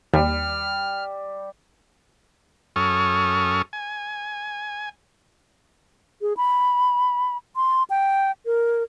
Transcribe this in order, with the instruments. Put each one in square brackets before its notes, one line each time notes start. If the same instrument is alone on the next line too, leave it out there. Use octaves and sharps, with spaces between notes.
[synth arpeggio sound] D#2 [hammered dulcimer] G3 [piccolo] F6
[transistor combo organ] F#2 C#4 A4 C#6 D#6 F6
G#5
[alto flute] G#4
B5
C6
G5
A#4